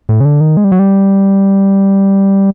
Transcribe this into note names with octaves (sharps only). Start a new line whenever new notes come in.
A2
C#3
D3
D#3
G#3
G3
F#3
G3